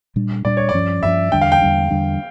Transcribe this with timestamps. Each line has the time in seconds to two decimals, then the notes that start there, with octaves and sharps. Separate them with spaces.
0.16 A#2 G3 D4
0.45 A#2 G3 D4 D5
0.57 C#5
0.69 D5
0.74 G2 F3 C#4
1.03 G2 F3 C#4 E5
1.32 E2 D3 G3 D4 G5
1.41 F5
1.52 G5
1.62 E2 D3 G3 D4
1.91 E2 D3 G3 D4